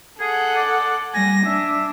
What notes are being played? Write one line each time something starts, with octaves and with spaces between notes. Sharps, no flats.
G#4 A4 F#5
D5
G3 G#5 A#6
D4 E5